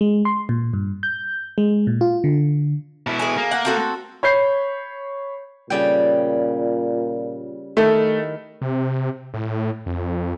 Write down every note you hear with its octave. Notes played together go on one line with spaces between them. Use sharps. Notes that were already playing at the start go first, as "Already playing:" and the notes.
G#3
C6
A#2
G2
G6
G#3
A#2
F4
D3
B2 E4
G#4 G#5
A#3
F#5
C4 F#4 A4
C#5 B5 G6 C7
A#2 C#3 G3 G5
D#3 A3 E4
C3
A2
F2